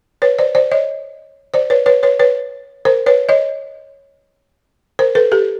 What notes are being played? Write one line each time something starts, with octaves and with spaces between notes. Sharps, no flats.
B4 C#5
C5 D5
C5 D5
C#5 D#5
C5 D5
B4 C#5
B4 C#5
B4 C#5
B4 C#5
A#4 C5
B4 C#5
C#5 D#5
A#4 C5
A4 B4
G4 A4